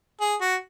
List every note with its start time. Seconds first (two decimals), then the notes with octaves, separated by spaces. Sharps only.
0.21 G#4
0.41 F#4